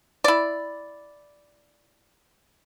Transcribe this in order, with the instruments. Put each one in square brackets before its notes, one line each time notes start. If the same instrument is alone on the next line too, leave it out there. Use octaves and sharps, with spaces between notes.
[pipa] E4 D5